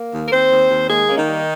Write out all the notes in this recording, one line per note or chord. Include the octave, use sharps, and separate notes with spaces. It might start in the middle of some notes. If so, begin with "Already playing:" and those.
Already playing: A#3
D#2
A#4
D#2 C4 C5
D#2
D#2
G#3 A#3 G#4
A#3 C#4
D#3 D#4
G3